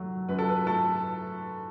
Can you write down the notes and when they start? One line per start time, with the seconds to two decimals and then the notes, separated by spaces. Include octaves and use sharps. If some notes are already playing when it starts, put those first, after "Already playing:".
Already playing: F#2 F#3 A3
0.29 F#2 B4
0.39 A4
0.49 B4
0.67 A3 A4